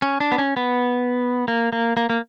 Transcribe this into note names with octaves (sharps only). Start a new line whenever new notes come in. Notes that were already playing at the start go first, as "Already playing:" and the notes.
C#4
D4
B3
C#4
B3
A#3
A#3
A#3
A#3